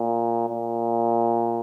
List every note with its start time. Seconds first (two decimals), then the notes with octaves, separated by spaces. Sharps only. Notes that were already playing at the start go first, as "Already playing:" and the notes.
Already playing: A#2
0.49 A#2